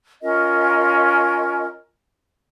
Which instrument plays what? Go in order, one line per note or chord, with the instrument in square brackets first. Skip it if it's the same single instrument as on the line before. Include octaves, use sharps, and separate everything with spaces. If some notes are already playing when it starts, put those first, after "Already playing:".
[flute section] C#4 F4 A#4 D#5